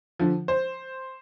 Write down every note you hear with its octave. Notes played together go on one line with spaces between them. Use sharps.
D3 F3
C5